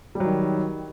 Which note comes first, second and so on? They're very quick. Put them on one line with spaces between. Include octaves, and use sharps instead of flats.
G3 F#3 D#3